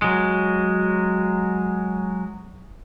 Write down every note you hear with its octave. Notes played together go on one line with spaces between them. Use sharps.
F#3 G#3